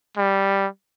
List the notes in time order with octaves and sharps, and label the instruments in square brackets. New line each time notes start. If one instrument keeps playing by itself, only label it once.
[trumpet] G3